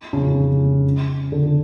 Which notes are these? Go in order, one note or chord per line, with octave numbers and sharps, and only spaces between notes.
C#3
D3